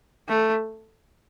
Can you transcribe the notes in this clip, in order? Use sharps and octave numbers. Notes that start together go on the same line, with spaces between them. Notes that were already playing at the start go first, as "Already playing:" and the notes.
A3